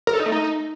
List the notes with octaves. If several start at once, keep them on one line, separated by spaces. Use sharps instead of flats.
A#4
A4
D#4
A3
D#4